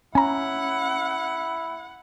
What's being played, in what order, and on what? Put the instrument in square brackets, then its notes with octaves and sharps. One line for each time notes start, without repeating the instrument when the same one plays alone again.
[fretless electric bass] C#4 [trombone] E4 [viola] F#5 [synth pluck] G#5 A#5